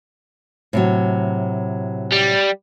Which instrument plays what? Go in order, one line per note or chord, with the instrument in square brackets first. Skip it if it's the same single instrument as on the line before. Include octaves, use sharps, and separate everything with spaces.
[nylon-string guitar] A2 C3 F#3
[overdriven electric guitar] G3